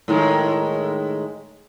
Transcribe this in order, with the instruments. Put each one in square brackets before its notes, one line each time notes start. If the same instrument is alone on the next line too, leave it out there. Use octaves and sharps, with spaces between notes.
[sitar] A2 D#3 G#3